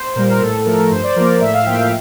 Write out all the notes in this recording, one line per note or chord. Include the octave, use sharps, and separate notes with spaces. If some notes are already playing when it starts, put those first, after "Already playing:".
Already playing: C5
A#2 G3 A#4
A#4
A2 A4
F3 A3 A#4
G2 C5
D5
F3 A#3 A#4
D5
A2 E5
F5
F3 A#3 G5
F5